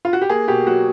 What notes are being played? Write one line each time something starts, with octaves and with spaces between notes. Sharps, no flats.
F4
F#4
G4
A#3 G#4
B2 G4
F#3 F#4